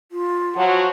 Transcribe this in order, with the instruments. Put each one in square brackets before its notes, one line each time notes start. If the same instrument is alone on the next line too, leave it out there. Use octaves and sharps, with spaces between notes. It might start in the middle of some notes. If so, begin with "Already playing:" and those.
[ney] F4
[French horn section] F3 F#3 F#4